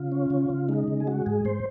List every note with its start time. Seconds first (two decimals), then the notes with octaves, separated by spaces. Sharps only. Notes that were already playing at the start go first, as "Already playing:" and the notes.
Already playing: C#3 F4
0.12 C#4
0.30 C#3
0.50 C#3
0.69 G#3 D#4
0.88 C#3
1.00 G#4
1.07 G#3 F#4
1.26 G#2 G#4
1.45 G#2 C5